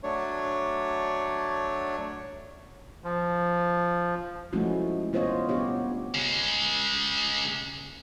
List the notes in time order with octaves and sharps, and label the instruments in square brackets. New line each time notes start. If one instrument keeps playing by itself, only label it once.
[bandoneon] F#3 A3 D4 C#5
F3
[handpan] F3 G#3 A3 C#4 E4 F#4
B3 F4 C5 C#5 D#5
B3 D4 G4 C#5
[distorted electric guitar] C#3 G#3